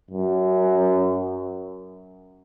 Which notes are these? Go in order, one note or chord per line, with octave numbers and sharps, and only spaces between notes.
F#2